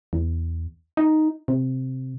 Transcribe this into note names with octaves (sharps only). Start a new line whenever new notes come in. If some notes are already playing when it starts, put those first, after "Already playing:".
E2
D#4
C3